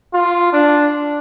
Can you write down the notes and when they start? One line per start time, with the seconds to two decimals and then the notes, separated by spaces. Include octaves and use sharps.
0.14 F4
0.53 D4